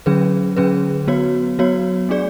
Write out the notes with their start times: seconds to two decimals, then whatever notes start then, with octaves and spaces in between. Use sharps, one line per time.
0.06 D3 F#3 C#4 G#4 B4
0.56 D3 F#3 C#4 G#4 B4
1.07 F#3 B3 F#4 C#5
1.59 F#3 B3 F#4 C#5
2.09 A3 D4 G#4 D5